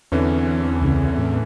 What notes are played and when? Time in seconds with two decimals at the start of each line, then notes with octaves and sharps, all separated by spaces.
0.12 E2 D3 E3 C4 C#4
0.81 C#2 C#3
1.18 A2